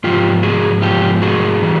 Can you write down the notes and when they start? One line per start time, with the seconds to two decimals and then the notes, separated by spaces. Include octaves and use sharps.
0.04 G#2 F3 F4 G4
0.43 F#4 G#4
0.82 G#2 F3 F4 G4
1.22 F#4 G#4
1.62 E3 G3